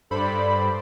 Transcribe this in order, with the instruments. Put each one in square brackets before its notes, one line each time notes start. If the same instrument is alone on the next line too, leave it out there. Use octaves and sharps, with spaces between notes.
[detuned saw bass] G2 [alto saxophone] A4 [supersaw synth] C5 D5 [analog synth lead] B5